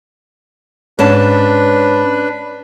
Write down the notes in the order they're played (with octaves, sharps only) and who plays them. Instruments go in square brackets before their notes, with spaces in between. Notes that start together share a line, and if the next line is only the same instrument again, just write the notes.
[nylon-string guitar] G#2 C#4 A5 [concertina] D4 B4